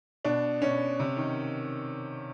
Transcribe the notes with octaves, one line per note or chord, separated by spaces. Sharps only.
B2 D4
B2 C#4
C3
D#3